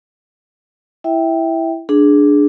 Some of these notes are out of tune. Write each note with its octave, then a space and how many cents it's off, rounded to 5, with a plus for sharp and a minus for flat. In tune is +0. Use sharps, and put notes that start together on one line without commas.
E4 +0 E5 -10 G5 +0
D4 +0 G#4 +5